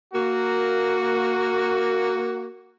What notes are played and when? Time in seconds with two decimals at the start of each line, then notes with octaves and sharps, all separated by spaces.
0.14 A#3 F#4